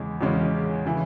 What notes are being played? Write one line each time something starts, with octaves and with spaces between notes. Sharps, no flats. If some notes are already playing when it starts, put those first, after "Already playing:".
Already playing: E2 C#3 G#3
E2 C#3 G#3 C#4
C#3 E3